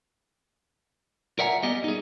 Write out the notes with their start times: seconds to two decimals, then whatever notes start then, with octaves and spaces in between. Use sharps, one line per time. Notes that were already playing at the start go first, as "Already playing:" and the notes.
1.39 A#4 D5 E5 F#5 G#5 A#5
1.63 G3 B3 G4 D#5
1.84 D#4 G#4